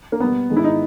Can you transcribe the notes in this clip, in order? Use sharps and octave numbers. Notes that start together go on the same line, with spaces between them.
A#3
B2 G3 B3
G#2 D#3 G#3
E4
D#4